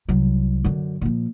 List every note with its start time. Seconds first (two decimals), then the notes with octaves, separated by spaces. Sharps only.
0.09 C2 F#3
0.65 F#2 D3
1.01 A#2 F3